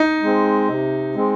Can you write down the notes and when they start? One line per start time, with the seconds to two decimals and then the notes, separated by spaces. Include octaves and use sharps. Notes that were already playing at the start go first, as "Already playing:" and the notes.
Already playing: D#4
0.22 G#3 C4
0.69 C3
1.15 G#3 C4